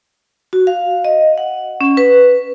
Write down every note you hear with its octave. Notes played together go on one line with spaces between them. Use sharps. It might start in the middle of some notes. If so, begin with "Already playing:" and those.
F#4
F5
D#5
F#5
C#4
B4